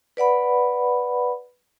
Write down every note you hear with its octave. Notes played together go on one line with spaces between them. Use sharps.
B4 D5 F#5 B5